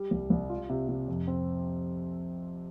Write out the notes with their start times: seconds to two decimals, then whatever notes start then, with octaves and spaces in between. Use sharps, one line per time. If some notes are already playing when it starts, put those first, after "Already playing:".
Already playing: G3
0.11 C2
0.30 C2
0.50 F4
0.69 C3
0.89 C3
1.08 F2
1.28 C4